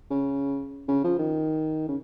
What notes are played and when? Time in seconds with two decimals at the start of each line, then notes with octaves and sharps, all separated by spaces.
0.11 C#3
0.88 C#3
1.04 F3
1.19 D#3
1.88 C#3